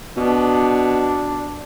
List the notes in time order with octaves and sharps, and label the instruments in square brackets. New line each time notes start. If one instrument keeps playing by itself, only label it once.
[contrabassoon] B2 [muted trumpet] D4